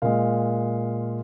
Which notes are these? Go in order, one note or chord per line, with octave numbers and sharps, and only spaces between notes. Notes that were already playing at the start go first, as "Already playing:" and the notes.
A#2 G#3 F5